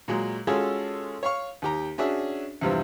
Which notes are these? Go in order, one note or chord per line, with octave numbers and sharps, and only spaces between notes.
A#2 F#3 G#3
G#3 C#4 F4 F#4 G#4 A4
C#5 F5 C#6
D#2 G4 A#5
C#4 D4 F#4 G#4 E5
E2 G2 C3 F3 G3 C4